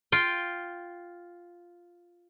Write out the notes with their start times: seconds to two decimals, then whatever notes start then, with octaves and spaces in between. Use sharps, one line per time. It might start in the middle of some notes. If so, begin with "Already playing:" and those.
0.12 F4 G5